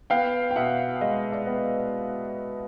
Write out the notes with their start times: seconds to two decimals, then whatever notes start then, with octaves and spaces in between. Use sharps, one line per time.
0.10 B3 F5 G5
0.51 G5
0.56 B2 E5 F#5
1.01 G#3 D#5 F5
1.32 D5 E5
1.47 B3